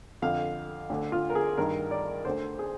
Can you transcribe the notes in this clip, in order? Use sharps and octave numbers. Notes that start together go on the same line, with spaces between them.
F2 D3 F5
D2 D3
F4
A#4
G#4
G2 D#3 A#4
D5
D2 D3 C5
G#4